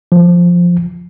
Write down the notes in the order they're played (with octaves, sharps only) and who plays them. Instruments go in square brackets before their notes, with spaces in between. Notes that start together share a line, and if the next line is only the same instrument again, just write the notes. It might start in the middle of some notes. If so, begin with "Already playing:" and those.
[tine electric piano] F3